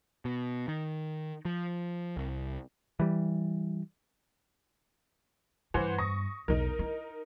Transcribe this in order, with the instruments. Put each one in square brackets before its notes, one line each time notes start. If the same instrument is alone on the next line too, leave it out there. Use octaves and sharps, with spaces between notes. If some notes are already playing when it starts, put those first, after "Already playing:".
[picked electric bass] B2
D#3
F3
C2
E3 G3
[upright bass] G2 [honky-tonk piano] E3 C5 F#5
[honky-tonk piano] C#6 D#6 A#6
[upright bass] B1 E2 [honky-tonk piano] D#4 A#4
[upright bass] E4